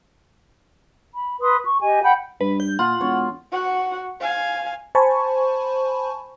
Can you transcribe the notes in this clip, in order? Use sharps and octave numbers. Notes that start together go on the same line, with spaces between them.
B5
B4 C6 D#6
C#6
G4 D#5 G#5
F#5 G5 B5 G6
G2 B4
G6
A#2 F4 F#5
E1 C#5
F#4 F#5
F5 G#5
C5 G#5 A5 B5 C#6